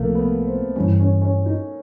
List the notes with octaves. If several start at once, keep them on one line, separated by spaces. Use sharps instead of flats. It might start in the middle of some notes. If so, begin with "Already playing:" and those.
Already playing: C2 C3 F3 A3 A#3
B3
C4
G2 E3 G3 C#4
C#4
C#4
D#4